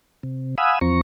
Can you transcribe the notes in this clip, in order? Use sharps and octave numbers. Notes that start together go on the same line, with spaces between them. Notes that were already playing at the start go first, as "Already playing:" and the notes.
C3
F5 F#5 G#5 B5 D#6 E6
E2 F3 C4 A#5 C#6